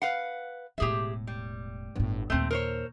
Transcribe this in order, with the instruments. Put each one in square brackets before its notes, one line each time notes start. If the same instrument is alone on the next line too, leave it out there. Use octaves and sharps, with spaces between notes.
[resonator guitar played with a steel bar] B4 F5 F#5
[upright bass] E1 A2 [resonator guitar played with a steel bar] G4 G#4 E5
[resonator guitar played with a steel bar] G3
[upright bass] G1 A2
[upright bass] D#2 A#2 [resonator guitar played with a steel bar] A3 C4
[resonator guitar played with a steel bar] A#4 C5 C#5